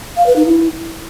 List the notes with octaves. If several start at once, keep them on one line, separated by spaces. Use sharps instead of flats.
F5
B4
D#4
E4